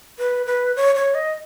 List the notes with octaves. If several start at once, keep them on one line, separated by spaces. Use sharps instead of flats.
B4
B4
C#5
C#5
D#5